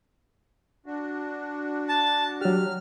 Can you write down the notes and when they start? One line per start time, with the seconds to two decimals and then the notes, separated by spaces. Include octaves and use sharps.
0.86 D4 F#4
1.89 A5
2.41 F#3 G4 F6